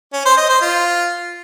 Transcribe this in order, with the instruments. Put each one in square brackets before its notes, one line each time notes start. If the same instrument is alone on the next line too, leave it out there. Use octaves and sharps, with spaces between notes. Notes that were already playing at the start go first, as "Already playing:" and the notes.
[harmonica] C#4
C5
D#5
C5
F4